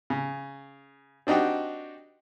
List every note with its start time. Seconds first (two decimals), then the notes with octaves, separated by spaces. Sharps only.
0.10 C#3
1.27 C4 D4 D#4 F#4 G4